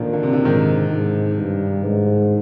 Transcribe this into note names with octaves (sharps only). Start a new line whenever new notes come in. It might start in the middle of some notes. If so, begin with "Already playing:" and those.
Already playing: A#2 D3 D#3 F3
D3
C3
D3
G#2 D#3
G#2
G2
G#2